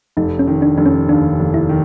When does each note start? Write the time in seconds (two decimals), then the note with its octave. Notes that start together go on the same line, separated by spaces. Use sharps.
0.17 F1 D#4
0.39 C#4
0.47 D#3
0.62 D4
0.78 F1 D4
0.86 C#4
1.08 D#2 D4
1.40 F1
1.54 E4
1.69 D#3